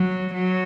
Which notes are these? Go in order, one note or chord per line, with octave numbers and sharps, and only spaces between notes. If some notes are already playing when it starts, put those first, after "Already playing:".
Already playing: F#3
F#3